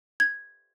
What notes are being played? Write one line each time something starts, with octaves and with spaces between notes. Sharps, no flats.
G#6